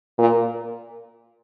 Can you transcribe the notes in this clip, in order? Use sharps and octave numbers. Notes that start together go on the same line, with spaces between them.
A#2